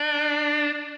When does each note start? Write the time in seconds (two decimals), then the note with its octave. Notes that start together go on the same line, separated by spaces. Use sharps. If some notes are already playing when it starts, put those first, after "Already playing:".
Already playing: D4